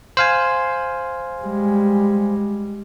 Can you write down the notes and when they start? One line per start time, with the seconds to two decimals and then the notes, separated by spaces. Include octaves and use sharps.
0.17 C5 F5 G#5
1.42 G3 G#3